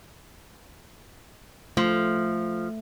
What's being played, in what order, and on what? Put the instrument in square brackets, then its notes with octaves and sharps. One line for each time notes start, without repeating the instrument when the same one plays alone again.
[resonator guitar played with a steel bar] F3 [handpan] A3